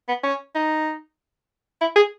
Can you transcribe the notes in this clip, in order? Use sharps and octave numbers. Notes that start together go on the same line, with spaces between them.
B3
C#4
D#4
E4
G#4